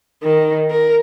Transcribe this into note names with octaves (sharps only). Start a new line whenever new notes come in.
D#3
A#4